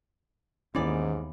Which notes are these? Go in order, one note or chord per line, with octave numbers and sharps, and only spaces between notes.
D#2 G#2 D#3 E3 B3 C#4 D5